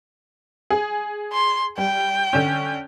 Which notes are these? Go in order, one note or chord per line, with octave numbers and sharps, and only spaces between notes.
G#4
C6
G3 G5
D3 C#4